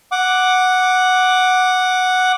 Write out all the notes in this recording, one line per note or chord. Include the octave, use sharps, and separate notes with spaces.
F#5 D6